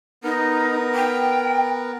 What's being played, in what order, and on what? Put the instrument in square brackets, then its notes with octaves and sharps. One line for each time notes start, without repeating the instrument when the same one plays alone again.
[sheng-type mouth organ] B3 A#4 [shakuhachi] D#4
[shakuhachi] G5